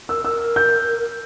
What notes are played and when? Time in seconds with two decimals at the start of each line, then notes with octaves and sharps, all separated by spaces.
0.08 A#4 E6
0.25 A#4 E6
0.56 G6